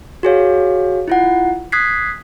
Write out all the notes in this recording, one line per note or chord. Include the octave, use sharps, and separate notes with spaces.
F#4 G#4 C#5 F5
E4 F4 F#5
D#6 F#6 G#6 B6 C7